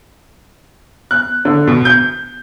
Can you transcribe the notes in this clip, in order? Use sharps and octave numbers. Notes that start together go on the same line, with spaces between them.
F#6
D3
B2
G6